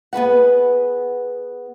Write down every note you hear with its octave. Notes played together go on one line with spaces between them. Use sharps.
B3 G#4 B4 F#5